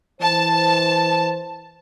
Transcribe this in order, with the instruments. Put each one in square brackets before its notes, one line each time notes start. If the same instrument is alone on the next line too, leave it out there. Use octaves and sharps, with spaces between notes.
[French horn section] E3 C5 [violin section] A5